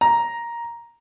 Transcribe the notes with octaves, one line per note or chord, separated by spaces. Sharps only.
A#5